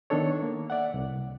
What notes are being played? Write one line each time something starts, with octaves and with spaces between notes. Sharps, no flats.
D#3 B3 D4 A4 C#5
A#3
D5 E5 F#5
C2